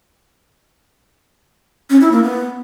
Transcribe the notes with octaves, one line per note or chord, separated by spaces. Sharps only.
C#4
E4
A#3
B3